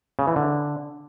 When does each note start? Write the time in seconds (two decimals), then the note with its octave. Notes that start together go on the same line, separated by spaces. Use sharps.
0.19 C#3
0.27 E3
0.36 D3